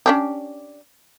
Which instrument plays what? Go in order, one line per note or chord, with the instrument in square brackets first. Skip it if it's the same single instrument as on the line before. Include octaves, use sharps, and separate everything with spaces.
[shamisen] C#4 D4 G4